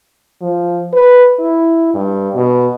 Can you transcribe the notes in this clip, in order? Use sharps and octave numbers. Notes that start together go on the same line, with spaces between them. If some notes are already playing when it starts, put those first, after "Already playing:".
F3
B4
E4
G2
B2